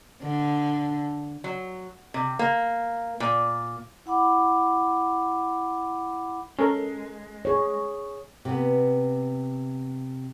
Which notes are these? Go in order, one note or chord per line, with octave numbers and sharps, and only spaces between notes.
D3
F#3
C3
A#3
A#2
E4 F#5 B5 D6
G#3 C#4 A4 A#4
G#4 C#5
C3 B3